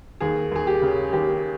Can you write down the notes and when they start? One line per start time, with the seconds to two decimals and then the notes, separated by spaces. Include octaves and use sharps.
0.20 D#2 G#4
0.52 D#2 G#4
0.67 G4
0.82 C#3
1.13 D#2 G4